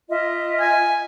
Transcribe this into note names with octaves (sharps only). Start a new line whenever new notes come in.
F4 D#5 E5
G#5